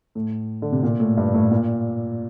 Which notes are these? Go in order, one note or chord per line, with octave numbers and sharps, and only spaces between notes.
A2
D3
C3
A#2
A2
G2
A2
A#2